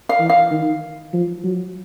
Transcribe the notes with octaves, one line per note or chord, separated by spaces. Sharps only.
F5
E3
F5
D#3
F3
F#3